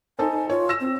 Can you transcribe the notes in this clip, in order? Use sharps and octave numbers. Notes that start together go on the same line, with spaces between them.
D#4 A4 C5 G#5
F4 C#5
E6 A#6 E7
C4